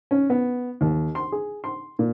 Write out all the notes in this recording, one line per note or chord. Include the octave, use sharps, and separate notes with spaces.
C#4
B3
D#2
C6
G#4
C6
A#2